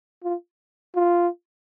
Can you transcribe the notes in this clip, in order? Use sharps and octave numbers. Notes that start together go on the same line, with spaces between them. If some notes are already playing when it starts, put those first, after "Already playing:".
F4
F4